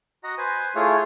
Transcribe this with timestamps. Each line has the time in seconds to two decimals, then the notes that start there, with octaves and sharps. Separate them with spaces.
0.24 F#4 D#5 F#5 A#5
0.38 B4 C5 G#5
0.75 A3 E4 F4 G#4 C#5